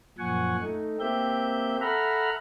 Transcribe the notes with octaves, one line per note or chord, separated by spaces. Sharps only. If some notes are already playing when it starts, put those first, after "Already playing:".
F#2 A#2 F3 F#5 G#5 C#6
A3 D#4
A#3 C4 G4 E5 G6
A4 E5 F#5 A#5 B5 F6